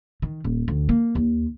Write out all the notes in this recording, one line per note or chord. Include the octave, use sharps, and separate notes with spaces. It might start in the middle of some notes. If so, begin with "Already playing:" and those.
D#3
D#1
D2
A#3
D#2